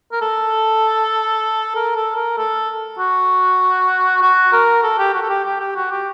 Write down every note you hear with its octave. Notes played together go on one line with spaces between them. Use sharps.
A#4
A4
A#4
A4
A#4
A4
F#4
F#4
A#4
A4
G4
F#4
A4
G4
G4
G4
F#4
G4